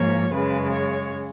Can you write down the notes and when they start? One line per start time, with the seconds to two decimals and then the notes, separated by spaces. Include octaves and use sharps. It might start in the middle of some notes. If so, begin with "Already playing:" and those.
Already playing: G#2 F3 A#3 C#5
0.33 F#2 C#3 G#3 B4
0.73 C#5